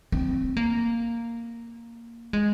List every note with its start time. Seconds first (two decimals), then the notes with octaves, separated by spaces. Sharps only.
0.12 C4
0.57 A#3
2.33 G#3